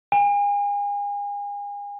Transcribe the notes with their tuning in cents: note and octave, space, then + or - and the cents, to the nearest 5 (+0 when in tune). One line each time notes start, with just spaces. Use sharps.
G#5 -35